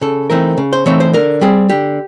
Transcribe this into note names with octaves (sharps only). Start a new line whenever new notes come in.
C#3 A4
E3 A3 C4 D#4 A#4
C#3
C5
E3 A3 C4 D#4 C#5
C5
D3 A#4
G3 C4 G#4
D3 G4